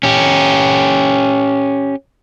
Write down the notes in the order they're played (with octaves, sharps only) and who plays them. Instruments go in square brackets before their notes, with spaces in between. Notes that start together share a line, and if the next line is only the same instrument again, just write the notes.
[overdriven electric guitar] C#4 G4